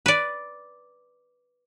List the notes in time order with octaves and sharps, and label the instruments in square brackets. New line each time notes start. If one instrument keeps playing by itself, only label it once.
[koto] B4 D5